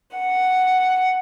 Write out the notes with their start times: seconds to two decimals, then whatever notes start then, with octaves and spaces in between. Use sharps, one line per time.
0.18 F#5